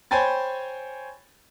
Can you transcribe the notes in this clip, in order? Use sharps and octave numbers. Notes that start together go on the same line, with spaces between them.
C5 C#5 G5 G#5 B5 A6